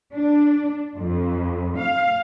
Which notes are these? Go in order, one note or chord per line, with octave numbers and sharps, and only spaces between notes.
D4
F2
F5